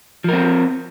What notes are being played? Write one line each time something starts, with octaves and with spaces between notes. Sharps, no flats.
F3 C4 A#4